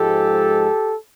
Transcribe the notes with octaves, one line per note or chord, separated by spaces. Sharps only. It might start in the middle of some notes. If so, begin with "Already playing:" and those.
Already playing: G#2 F3 G#3 G4 A4